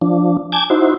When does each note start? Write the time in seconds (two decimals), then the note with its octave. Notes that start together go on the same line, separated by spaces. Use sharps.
0.01 F3 D4
0.52 G#5 A5 D6 G6 G#6
0.70 D#4 E4 F#4 C5